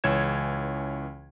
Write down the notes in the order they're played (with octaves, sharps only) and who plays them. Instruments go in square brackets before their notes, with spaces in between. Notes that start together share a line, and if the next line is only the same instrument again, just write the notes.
[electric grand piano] C#2 E3 C#4 C#5 G#6 E7